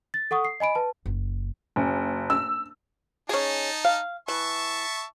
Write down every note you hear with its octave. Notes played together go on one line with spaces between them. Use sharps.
A6
A4 F#5 C#6 D#6
C7
D#5 G#5 B5 D7
B4 A5
F#1
F#1
E6
C#4 D#4 G#4 A5
F5
E3 E5 A5 C#6